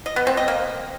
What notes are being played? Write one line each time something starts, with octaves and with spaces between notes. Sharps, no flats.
D#5
B3
C4
D#5
A#3